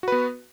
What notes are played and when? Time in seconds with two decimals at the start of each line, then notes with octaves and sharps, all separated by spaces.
0.03 F#4
0.08 B4
0.12 B3